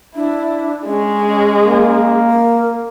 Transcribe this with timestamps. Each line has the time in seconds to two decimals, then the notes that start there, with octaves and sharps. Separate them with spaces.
0.15 D4 E4
0.86 G#3 C#4
1.66 A#3
2.30 A#4